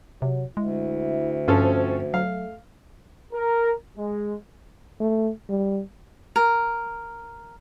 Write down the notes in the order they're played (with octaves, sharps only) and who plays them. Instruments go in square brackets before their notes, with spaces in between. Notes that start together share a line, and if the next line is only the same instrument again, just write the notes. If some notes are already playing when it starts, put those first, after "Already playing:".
[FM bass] C3 [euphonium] F#3
[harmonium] D2 [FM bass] G#3 [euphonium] E4
[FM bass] G2 [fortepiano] F3 C#4 A4 [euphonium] C4
[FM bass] F#3 [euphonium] A3 [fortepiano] F5
[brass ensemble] A#4
G#3
[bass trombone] A3
G3
[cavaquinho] A#4